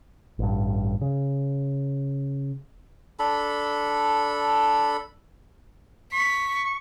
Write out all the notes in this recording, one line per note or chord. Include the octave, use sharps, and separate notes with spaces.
A1 G2
C#3
D4 A4 B5
C#6 B6